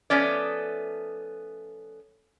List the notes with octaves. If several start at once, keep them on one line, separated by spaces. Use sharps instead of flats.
F3 A3 B3 C#4 D5